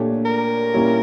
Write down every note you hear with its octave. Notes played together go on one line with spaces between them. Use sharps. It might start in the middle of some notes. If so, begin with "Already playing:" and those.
Already playing: A#2 A3 D4 G4 C#5
A#4
A#2 G3 C#4 E4